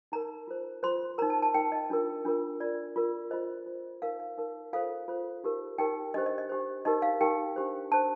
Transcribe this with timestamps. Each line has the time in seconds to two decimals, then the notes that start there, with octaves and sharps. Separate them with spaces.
0.12 D#4 A#4 A#5
0.48 F4 C5
0.83 F4 C5 C6
1.18 A#4 A#5
1.22 D#4
1.30 A5
1.42 A5
1.54 D#4 A#4 G5
1.72 D#5
1.90 D4 F4 A#4
2.25 D4 F4 A#4
2.60 F4 A#4 D5
2.96 F4 A#4
3.31 F4 C5 D#5
3.66 F4 C5
4.02 D#4 A#4 F5
4.20 F5
4.37 D#4 A#4
4.73 F4 A4 C5 F5
5.08 F4 A4 C5
5.44 D#4 G4 A#4
5.78 D#4 G4 A#4 G5
6.14 D4 G4 C5 D#5
6.26 D#5
6.38 D#5
6.49 D4 G4 C5
6.85 D#4 G4 A#4 D#5
7.02 F5
7.21 D#4 G4 A#4 G5
7.56 D4 G4 C5
7.91 D4 G4 C5 A5